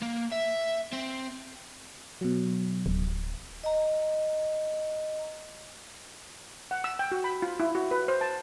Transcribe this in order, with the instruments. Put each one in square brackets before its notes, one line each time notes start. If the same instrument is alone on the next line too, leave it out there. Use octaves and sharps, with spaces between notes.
[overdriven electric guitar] A#3
E5
C4
[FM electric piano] B2 F#3
[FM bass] D1
[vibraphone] D#5 A#5
[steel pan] F#5
E6
G5
F#4
B5
F4
E4
F#4
B4
C5
A5